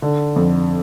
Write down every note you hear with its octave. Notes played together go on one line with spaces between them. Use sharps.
D3
F2